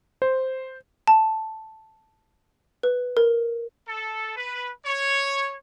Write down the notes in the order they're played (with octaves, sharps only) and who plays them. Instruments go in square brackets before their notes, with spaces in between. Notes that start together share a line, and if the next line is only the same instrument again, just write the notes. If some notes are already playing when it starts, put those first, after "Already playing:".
[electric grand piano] C5
[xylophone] A5
B4
A#4
[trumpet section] A4
B4
C#5